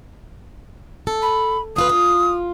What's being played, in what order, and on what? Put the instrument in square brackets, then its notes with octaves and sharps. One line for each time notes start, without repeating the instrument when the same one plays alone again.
[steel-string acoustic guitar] A4
[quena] B5
[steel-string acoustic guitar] D2 F4 B4 [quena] D#6
[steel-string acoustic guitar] F4